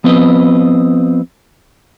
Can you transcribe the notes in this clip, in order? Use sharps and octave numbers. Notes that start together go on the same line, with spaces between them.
F3 B3 C4 B4 D#5